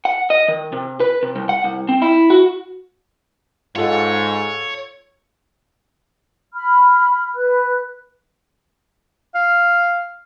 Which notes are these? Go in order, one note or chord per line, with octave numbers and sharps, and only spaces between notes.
F#5
D#5
D#3
C3
B4
C3
C2
F#5
C2
C4
E4
F#4
G#2 F4 A4 C#5 F#5
B5 F6
B4 F#6
F5